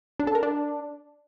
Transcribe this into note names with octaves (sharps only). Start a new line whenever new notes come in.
D4
A4
A#4
D4